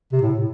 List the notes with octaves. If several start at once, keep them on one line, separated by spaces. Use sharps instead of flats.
C3
A2